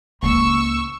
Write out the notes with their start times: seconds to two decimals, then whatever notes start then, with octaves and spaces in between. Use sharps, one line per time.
0.23 C#2 A#3 C#6 E6